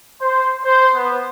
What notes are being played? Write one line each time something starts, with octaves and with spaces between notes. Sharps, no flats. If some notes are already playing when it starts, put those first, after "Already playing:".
C5
C5
B3